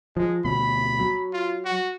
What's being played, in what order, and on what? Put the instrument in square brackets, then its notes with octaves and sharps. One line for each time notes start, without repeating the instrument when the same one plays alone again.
[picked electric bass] F3 [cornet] G#3
[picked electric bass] D2 B2 F#3 [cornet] B5
[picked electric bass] F#3
[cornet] F4
F#4